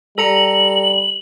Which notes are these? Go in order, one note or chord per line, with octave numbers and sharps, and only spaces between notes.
G3 A4 A#5 C#7 F#7